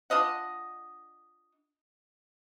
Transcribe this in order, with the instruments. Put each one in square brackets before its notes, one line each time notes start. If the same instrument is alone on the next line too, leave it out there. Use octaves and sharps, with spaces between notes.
[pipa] D4 F4 D#5 F#5